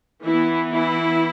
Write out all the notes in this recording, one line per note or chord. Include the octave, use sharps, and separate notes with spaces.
E3 B3 E4
E4